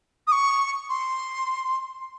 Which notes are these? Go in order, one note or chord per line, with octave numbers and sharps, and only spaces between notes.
D#6
C#6
C6